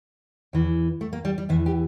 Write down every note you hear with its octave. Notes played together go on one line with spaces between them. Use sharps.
E2 E3
A3
A#3
G3
G3
E2 E3 E4
G4